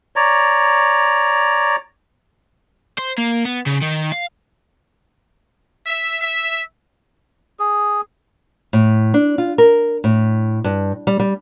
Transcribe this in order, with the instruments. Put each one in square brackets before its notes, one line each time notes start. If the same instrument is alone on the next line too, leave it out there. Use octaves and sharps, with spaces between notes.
[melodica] C#5 D5 A#5
[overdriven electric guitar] C5
A#3
B3
C#3
D#3
F5
[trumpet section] E5
E5
[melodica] G#4
[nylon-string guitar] A2
D4
F4
A#4
A2
G2
G3
G3